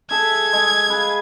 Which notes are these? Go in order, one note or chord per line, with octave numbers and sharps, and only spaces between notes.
G#4 A4 E5 G#6
G#3
G#4 B4 F5